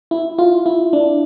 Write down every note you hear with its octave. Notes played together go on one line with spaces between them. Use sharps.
E4
F4
E4
D4